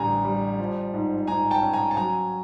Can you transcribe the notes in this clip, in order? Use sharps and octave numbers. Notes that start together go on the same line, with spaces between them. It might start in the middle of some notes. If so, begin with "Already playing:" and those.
Already playing: A1 D3 G3 G#5 A#5
G3
F3
G#2
G#2 G#5 A#5
G5 A5
C#4
G#5 A#5
A5
F#3 G#5 A#5